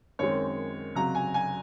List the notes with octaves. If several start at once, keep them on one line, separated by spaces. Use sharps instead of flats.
F#2 D#3 G#3 C4 C#5
C#2 C3 F#3 A#5
G#5
G#5